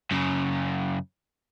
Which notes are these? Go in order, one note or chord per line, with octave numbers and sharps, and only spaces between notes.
F#2 C#3